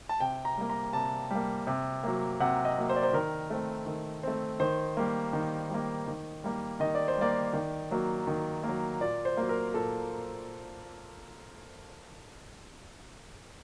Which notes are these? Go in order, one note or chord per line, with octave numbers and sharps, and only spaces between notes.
A5
C3 G5
A#5
G3 A#3
A#5
C3 A5
G3 A#3
C3
F#3 A#3
C3 F#5
D#5
F#3 A#3
C5
D5
C5
D#3 A#4
A3 C4
D#3
A3 C4
D#3 C5
G3 A#3
D#3
G3 A#3
D#3
G3 A#3
D#3 D#5
D5
C5
G3 A#3 D5
D#3
F#3 A#3
D#3
F#3 A#3
A#2 D5
C5
F#3 A#3
A#4
A#2 A4